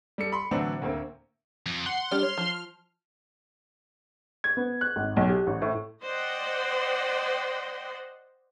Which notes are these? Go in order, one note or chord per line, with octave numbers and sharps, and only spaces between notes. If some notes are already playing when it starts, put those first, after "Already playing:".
G3 A4 C#7
B5 C6
A2 D3 E3 F#3 C4 D4
D2 A2 A#3 C4
F2
F#5 C6
G3 D4 G4 F6
C#5
F3
G#6
B3
F#6
G#1
B1
G4
A1
A2
C5 D5 D#5 F#5 G5 C6